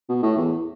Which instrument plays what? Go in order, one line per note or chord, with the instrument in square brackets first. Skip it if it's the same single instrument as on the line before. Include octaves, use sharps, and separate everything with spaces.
[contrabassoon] B2
A2
E2